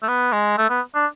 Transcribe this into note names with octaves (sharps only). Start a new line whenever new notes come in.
A3
B3
G#3
A3
B3
D4